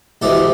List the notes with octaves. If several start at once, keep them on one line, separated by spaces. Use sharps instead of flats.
D2 C3 E3 G#3 C4 G4 A4